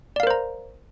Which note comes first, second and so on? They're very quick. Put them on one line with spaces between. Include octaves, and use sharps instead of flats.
D5 F5 A#4 C5 A#5